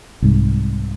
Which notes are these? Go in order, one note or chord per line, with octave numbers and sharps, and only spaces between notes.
C2 G#2